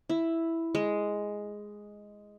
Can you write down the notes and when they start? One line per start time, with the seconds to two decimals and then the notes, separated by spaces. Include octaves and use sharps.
0.10 E4
0.75 G#3